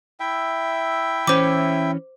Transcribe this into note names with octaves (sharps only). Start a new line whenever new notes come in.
E4 E5 G5
E3 C#4 C5 D6